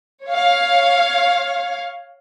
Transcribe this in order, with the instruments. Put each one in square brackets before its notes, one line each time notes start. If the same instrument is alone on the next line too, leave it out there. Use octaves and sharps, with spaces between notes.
[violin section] C#5 F5